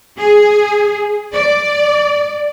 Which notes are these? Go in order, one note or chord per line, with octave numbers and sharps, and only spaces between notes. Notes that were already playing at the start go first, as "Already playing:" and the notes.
G#4
D5